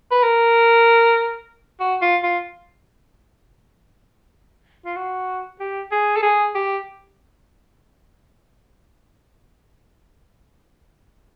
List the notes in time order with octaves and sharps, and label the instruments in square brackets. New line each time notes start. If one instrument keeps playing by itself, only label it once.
[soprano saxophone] B4
A#4
F#4
F4
F4
F4
F#4
G4
G#4
A4
G#4
G4